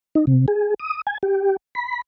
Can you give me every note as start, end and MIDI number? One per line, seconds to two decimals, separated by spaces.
0.15 0.25 63
0.27 0.46 48
0.48 0.74 68
0.80 1.01 87
1.07 1.18 80
1.23 1.56 67
1.75 2.02 83